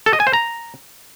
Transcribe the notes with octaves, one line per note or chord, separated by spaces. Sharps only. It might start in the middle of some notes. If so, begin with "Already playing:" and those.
A4
D#5
G#5
C5
A#5